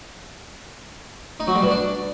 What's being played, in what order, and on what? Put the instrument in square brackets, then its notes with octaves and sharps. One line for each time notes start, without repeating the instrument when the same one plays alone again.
[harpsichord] D#4
F#3
G3
B2
D4